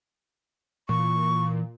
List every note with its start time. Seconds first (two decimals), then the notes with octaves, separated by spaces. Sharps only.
0.89 A#2 E3 C#6